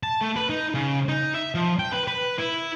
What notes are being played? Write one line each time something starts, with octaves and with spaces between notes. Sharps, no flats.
A5
A3
B4
D#4
C#3
D#4
E5
F3
G5
B4
B4
E4